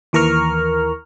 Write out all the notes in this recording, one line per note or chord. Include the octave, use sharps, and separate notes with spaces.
D#2 E3 A#4 A#5 C#6 F6